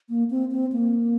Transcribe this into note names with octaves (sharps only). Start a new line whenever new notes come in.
A#3
C4
C4
A#3